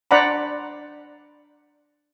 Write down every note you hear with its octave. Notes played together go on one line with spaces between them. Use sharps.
D4 C5 D5 F#5 A#5 B5